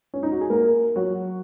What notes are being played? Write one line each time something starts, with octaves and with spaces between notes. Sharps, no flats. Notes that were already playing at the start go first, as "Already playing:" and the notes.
C#4
D#4
F#4
G#4
A#3 A#4
F#3 F#4